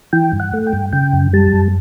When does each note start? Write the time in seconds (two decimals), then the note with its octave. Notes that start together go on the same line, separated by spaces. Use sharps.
0.13 E3 G5
0.33 G2
0.40 F#5
0.54 A3
0.67 G5
0.73 G2
0.93 C#3 G5
1.13 F#2
1.33 G3 A5
1.53 F#2